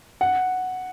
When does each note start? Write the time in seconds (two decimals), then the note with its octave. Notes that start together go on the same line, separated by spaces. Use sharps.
0.21 F#5